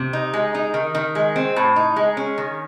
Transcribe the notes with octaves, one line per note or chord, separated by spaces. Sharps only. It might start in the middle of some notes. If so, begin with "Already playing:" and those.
Already playing: C3
D#4
G#3
D#4
D#3
D#3
G#3
C4
A2
D#4
G#3
C#4
D#3